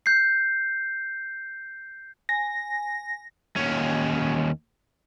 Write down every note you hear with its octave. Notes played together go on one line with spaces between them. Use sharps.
G6 C7
G#5 A#6
D#2 C#4